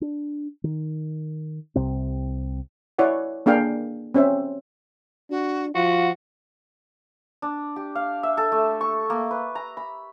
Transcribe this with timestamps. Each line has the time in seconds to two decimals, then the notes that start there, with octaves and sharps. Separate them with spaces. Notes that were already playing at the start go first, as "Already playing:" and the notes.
0.01 D4
0.64 D#3
1.76 C2 C3 C4
2.99 E4 C#5 D5 F#5
3.46 A#3 D4 G#4 F5 G5
4.14 C4 C#4 C5 E5
5.30 D4 F#4
5.75 F3 F4 F#4 F#5
7.42 D4
7.76 G4
7.95 F5
8.23 E5
8.37 A4
8.52 A3
8.81 C#6
9.10 A#3
9.31 B4
9.55 A#5
9.77 B5